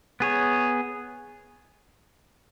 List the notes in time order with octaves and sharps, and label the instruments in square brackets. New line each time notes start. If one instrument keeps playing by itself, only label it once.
[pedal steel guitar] B3 G#4 C#5